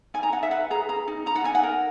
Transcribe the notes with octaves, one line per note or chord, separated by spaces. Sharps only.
D#4 G#5
A#5
D#4 F#5
E5
B4 F#5
G#4 A#5
G#4 A#5
D#4
D#4 A#5
F#5
D#4 G#5
F#5
A#4